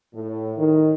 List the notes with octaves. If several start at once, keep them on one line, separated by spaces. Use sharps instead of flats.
A2
D#3